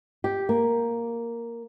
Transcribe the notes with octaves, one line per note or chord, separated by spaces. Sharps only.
G4
A#3